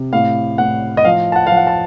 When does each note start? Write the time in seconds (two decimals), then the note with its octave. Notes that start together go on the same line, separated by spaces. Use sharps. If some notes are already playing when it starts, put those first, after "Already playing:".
Already playing: C3
0.13 A2 F5
0.58 A2 F#5
0.97 D#5
1.05 F3 F5
1.32 A5
1.36 F#5
1.47 F5
1.52 F3
1.57 F#5
1.67 A5